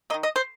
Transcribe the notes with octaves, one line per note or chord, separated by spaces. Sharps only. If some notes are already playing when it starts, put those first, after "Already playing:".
A#3 D#5
D#3
D#5
C5